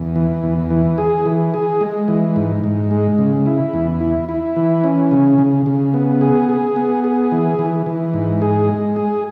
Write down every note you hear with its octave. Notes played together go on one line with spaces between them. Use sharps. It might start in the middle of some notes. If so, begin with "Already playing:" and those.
Already playing: E2
E3
E2
E3
G#4
E3
G#4
G#3
E3
G#2
G#2
G#3
C#3
E4
E2
E4
E4
E3
C#4
C#3
C#3
C#3
B3
G#4
G#4
B3
G#4
E3
E3
E3
G#2
G#4
G#3
G#4